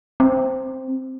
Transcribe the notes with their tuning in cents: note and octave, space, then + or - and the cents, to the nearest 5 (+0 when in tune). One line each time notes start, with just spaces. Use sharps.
C4 +0